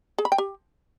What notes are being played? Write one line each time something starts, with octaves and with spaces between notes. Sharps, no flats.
G#4
B5
G5
G4